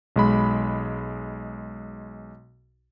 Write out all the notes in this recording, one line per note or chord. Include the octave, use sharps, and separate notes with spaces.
B1 G#3 B5